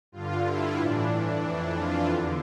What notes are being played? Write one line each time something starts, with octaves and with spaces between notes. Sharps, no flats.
G2 D3 F4
E4
A2 E3 D4
F2 E3
F4
E2 D3